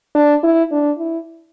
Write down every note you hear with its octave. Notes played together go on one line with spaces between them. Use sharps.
D4
E4
D4
E4